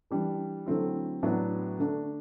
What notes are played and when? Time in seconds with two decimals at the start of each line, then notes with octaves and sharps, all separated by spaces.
0.10 E3 G3 D4
0.66 D3 F#3 A3 C4 E4
1.23 A2 F#3 B3 D4
1.79 D3 A3 D4